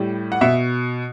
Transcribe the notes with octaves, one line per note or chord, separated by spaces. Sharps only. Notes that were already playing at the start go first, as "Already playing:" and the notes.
Already playing: A2 G3
F#5
B2 E5